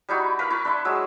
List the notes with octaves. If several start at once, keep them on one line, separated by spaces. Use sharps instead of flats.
G3 D#4 E4 F#4
A#4 B4 F5 B5
E4 B4 C#6
D4 E5 C6 C#6
F#3 G#3 E6